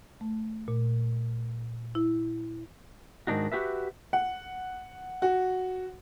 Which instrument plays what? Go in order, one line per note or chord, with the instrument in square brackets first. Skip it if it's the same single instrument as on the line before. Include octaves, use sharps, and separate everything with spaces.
[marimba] A3
A#2
E4
[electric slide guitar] G#2 D#3 G3 D4 D#4 F#4
F#4 G4 B4 E5
[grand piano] F#5
F#4